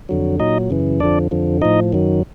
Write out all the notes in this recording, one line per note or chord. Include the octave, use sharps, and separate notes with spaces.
F2 D3 F#3
A#2 F#3 D#4 D#5
F#2 C#3 E3
F2 D3 F3 D4 D5
F2 D3 F3
A2 F3 D#4 D#5
F#2 D#3 F#3